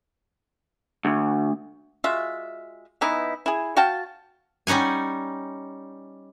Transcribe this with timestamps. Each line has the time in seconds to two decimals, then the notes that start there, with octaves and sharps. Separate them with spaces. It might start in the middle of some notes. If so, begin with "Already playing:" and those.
1.05 D2
2.04 G#3 F4 F#4 E5
3.01 E3 B3 D#4 E4
3.46 E4 G#4
3.77 F#4 F5 G5 A5
4.67 G3 C#4 D#4 F#5 G#5